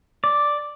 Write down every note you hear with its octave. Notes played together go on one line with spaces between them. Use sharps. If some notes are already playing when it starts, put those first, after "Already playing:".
D5